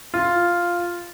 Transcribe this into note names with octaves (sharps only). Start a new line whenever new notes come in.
F4